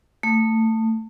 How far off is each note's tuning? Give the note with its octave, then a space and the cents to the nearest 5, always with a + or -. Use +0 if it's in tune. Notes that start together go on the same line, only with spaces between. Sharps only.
A3 +20